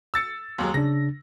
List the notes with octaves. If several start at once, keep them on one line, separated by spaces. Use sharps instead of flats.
E6 A6 C#7
D#2 F#3 G#3 C6
C#3 D4 A#6